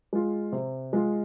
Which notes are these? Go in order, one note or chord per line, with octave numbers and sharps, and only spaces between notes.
G#3 F4
C3
G#3 F4